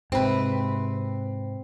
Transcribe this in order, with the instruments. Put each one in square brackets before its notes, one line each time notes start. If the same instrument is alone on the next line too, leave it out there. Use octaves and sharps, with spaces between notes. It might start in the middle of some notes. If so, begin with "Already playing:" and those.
[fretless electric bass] G#2 C3 [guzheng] C4 B4